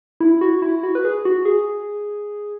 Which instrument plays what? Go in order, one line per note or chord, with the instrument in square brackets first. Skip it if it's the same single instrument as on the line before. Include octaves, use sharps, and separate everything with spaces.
[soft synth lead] E4
F#4
E4
F#4
B4
G#4
F#4
G#4